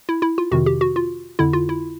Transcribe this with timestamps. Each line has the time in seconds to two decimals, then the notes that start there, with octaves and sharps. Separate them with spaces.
0.09 E4
0.22 E4
0.38 F4
0.51 F2 C3 D#3 F#4
0.66 G4
0.81 F#4
0.96 F4
1.39 F2 D3 E4
1.53 F4
1.69 E4